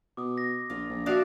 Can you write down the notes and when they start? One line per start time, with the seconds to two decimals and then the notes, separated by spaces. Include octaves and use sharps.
0.17 B2 D6 D#6
0.38 A#6
0.70 A#1 F4
0.90 A#1
1.06 D4 F#4 E5 F5 D6 D#6 F#6 A6